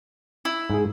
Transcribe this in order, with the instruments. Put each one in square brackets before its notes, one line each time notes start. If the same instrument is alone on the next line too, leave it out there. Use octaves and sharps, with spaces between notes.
[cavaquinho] E4
[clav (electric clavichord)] G#2 G#4